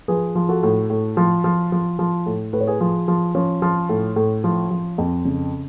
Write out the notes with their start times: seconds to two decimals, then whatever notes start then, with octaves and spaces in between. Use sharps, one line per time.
0.08 F3 G#4 B4
0.35 F3
0.49 F#4 A4
0.63 A2
0.90 A2
1.17 F3
1.44 F3
1.72 F3
1.99 F3
2.26 A2
2.53 A2 B4
2.61 C#5
2.67 G#4 B4
2.80 F3
3.08 F3
3.35 F3 C#4
3.62 F3
3.89 A2
4.16 A2
4.44 F3
4.71 F3
4.98 F2
5.25 C#3